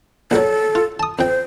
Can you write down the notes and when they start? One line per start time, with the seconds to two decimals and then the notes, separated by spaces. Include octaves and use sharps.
0.31 A#1 F#3 A4
0.75 F4
1.00 A5 D#6
1.19 F2 C5 G5